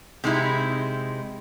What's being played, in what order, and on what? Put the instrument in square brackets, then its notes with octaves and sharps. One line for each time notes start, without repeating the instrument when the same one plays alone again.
[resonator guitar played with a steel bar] C3 G#3 D#4 E4